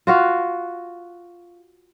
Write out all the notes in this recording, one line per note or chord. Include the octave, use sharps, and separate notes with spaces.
F4 F#4 F5